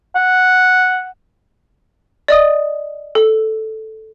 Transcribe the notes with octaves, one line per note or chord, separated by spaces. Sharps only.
F#5
D5 D#5 D#6
A4